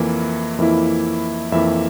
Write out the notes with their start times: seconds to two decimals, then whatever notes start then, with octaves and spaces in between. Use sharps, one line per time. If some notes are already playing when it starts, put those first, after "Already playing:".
Already playing: F2 E3 A#3 E4
0.59 F2 E3 A#3 E4
1.52 F2 E3 A#3 E4 E5